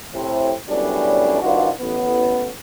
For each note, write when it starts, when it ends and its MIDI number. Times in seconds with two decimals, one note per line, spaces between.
0.14 0.52 45
0.14 0.52 48
0.14 0.52 60
0.69 1.40 42
0.69 1.40 45
0.69 1.40 55
0.69 1.40 59
0.69 1.40 61
0.69 1.40 62
1.42 1.69 36
1.42 1.69 43
1.42 1.69 51
1.42 1.69 62
1.42 1.69 65
1.42 1.69 66
1.81 2.50 33
1.81 2.50 59